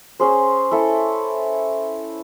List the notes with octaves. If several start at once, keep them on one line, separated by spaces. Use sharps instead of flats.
C#4 G#4 C5
E4 A4